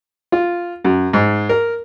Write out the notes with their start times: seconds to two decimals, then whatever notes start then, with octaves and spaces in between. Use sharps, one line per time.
0.32 F4
0.84 F#2
1.13 G#2
1.49 A#4